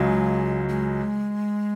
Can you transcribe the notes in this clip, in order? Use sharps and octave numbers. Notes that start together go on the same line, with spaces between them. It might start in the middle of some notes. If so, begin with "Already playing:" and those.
Already playing: C#2 C#3 F#3 G#3
G#3